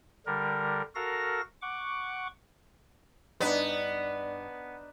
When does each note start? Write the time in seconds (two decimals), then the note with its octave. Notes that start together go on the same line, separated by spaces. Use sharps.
0.26 D3 G3 A#4
0.95 F#4 A4 A#4 F5 A#6
1.62 F#5 C#6 D6
3.40 G2 B3 D4 D#4 B4 D5